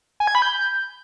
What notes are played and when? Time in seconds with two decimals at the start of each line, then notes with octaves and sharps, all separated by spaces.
0.20 G#5
0.27 G#6
0.35 B5
0.42 G6